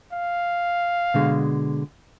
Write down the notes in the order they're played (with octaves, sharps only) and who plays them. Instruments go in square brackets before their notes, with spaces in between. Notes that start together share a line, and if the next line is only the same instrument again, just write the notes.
[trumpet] F5
[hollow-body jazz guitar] B2 D3 G#3